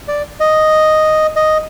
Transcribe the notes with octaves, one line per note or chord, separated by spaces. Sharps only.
D5
D#5
D#5